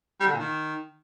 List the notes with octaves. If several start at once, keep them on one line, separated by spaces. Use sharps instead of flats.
G3
D3
A#2
D#3